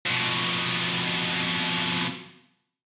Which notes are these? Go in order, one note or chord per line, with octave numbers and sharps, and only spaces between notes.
F2 B2